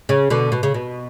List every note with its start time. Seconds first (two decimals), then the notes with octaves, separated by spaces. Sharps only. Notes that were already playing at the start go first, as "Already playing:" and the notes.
0.09 C#3
0.30 B2 D3
0.52 B2
0.63 C#3
0.74 B2